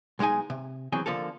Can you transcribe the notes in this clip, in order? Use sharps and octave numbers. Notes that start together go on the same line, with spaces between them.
B1 G#3 A#3 D#4 G#5
C3
E3 F#3 C4 G#4
D3 F3 A#3 A4